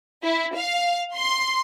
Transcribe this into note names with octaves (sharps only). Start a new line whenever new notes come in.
E4
F5
C6